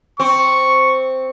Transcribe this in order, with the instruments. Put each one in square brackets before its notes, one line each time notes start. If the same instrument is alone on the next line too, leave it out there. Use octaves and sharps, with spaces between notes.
[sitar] C4 [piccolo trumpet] C#6